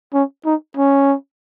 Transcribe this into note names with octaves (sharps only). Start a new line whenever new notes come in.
C#4
D#4
C#4